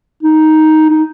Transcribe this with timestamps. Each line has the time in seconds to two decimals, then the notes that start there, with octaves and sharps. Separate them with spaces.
0.23 D#4
0.90 D#4